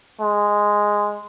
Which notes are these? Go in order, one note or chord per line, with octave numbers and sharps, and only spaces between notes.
G#3